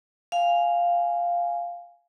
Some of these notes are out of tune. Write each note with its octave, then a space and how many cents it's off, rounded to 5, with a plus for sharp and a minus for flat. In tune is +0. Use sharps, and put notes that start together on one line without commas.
F5 +0 G#5 +0